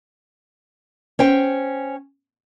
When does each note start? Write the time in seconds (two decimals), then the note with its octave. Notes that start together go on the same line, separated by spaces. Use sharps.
1.19 C#4 C5 G5